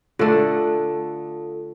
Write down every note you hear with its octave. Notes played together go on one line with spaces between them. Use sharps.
D3 A3 D4 F4 A4